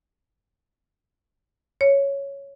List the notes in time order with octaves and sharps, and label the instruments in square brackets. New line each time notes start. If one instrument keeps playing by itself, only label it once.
[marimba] C#5